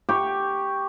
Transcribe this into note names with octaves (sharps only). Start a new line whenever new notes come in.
G4 C#6